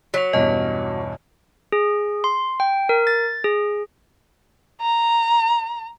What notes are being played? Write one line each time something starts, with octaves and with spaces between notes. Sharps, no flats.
F#3 B6 F7
E2 G2 B2 C#4 D#5 A5
G#4
C6
G5
A#4
A6
G#4
A#5